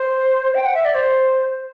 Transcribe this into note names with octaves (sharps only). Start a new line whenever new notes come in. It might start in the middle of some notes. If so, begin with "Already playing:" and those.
Already playing: C5
G5
F#5
E5
D5
C5